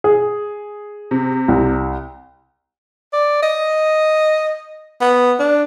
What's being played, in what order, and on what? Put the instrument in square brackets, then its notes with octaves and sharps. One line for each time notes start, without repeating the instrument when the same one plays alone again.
[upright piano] G#4
[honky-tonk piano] C3
[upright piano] C2
[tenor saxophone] D5
D#5
B3
D4